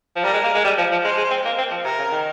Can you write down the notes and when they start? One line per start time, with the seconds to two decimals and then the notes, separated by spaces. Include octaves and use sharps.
0.16 F3
0.24 G3 A#4
0.33 G#3
0.43 A#3
0.55 G#3
0.64 G3
0.78 F3
0.91 F3
1.04 G#3 C5
1.17 G#3
1.31 C4
1.45 A#3
1.58 C4
1.71 F3
1.84 C3 A#4
1.98 C#3
2.12 D#3